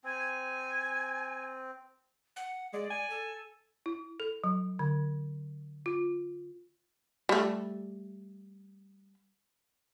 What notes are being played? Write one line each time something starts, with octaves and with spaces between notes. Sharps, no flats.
C4 G#5
F#5
G#3 D5
G#5
A4
E4
A4
F#3
D3
F4
G3 A3